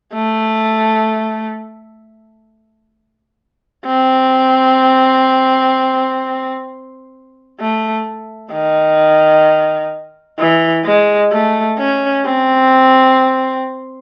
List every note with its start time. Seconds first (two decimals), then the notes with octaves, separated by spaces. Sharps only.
0.14 A3
3.86 C4
7.60 A3
8.52 D#3
10.39 E3
10.85 G#3
11.32 A3
11.79 C#4
12.25 C4